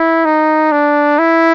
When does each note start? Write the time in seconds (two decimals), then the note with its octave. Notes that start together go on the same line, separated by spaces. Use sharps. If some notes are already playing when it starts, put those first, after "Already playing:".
Already playing: E4
0.25 D#4
0.72 D4
1.19 E4